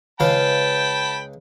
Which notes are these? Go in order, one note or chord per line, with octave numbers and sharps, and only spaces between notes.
C#2 C#3 B4 F5 G5 A5 B5